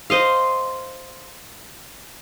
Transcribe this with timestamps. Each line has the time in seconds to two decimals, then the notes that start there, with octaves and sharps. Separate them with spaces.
0.10 C5 D#5 F5